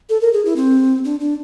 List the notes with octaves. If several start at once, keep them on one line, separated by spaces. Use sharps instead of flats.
A4
A#4
G#4
E4
C4
D4
D4